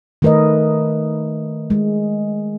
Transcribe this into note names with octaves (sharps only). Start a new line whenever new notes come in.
D#3 A3 A#4 B4 D#5
G#3